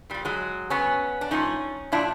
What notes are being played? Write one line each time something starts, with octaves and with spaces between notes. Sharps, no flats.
A#2 F3 G3
F#3 G#3
C#3 F#3 B3 C#4
D4
A2 F3 C#4 D#4
A#2 F3 D4 E4